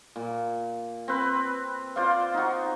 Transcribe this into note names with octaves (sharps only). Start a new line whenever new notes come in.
A#2
C4 B4
F4 C5 D5 F5
D#4 F#4